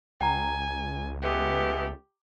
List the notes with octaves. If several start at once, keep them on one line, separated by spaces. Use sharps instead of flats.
C#2 G5 G#5 A#5
G#3 A3 B3 G4